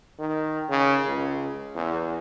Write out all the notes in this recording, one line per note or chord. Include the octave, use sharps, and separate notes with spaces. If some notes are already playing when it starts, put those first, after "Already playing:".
D#3
C#3
C#2
E2